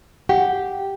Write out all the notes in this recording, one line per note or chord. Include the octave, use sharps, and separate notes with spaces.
G4 F#5